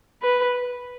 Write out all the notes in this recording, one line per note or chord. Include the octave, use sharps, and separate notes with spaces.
B4